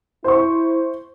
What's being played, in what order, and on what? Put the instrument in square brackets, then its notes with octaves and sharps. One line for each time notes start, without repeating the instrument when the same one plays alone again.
[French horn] E4 [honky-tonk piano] C5 C#6